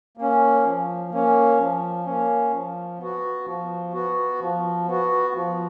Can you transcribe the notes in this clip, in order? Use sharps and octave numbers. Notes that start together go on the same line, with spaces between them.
A#3 C#4
F3
A#3 C#4
F3
A#3 C#4
F3
B3 F#4
F3
B3 F#4
F3
B3 F#4
F3